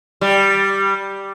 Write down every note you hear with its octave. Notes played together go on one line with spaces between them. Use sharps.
G3